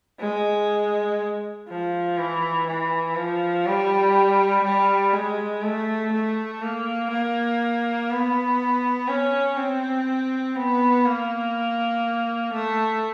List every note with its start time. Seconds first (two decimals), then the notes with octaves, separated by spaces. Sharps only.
0.19 G#3
1.69 F3
2.18 E3
2.67 E3
3.15 F3
3.66 G3
4.64 G3
5.13 G#3
5.63 A3
6.13 A3
6.62 A#3
7.10 A#3
8.10 B3
9.08 C#4
9.57 C4
10.56 B3
11.05 A#3
12.54 A3